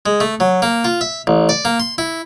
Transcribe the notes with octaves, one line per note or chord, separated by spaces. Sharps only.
G#3
A3
F#3
A#3
F4
E5
A1
D5
A#3
C6
E4